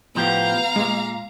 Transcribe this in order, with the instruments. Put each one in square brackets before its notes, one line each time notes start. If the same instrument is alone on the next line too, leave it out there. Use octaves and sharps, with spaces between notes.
[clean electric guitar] A2 F3 G4 [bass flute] B3 [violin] F5 A#5
[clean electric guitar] A#2 [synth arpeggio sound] G#3